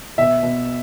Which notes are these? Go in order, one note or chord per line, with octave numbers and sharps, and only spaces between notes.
B2 E5
B2